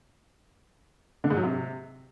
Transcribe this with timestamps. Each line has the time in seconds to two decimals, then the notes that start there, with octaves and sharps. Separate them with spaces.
1.24 D3
1.30 G#2
1.37 F#3
1.43 C3